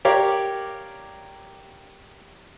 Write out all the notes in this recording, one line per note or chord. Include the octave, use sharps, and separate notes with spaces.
G4 A#4 C#5 D5 F5